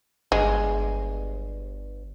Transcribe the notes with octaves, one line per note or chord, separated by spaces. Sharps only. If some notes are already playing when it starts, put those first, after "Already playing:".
G1 G#3